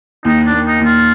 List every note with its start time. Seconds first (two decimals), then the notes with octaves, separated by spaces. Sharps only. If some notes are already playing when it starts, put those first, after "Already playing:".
0.25 D#2 D#4
0.46 D4
0.52 A#3
0.66 D#4
0.80 D#2
0.85 F4